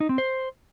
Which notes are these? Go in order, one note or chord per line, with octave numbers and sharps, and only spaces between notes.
D#4
C4
C5